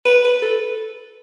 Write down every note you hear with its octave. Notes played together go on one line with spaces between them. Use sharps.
B4
B4
A4